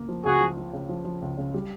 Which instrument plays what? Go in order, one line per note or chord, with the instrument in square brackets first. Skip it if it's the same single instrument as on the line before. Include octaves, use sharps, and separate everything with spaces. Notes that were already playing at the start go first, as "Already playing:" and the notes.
Already playing: [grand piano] C#2 A#3
F3
[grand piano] C#2 [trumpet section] F#4 G#4
[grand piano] F3
F3
C#3
F3
F3
C#2
C#3
G3